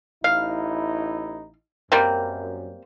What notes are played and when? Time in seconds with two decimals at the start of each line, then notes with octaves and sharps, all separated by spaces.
0.24 A1 D#4 E4 F5
1.92 F#2 G3 A#3 C4